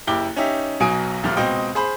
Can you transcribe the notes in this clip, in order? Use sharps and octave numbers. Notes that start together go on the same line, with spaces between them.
F#1 E4 G4 D6 G7
C#4 D#4 G4 E5
B1 B2 F#3 G#5 D#6 D7
D#1 D2 A#2 F3 F6
C#2 B2 C4 D#5 G5
G#4 C5 B5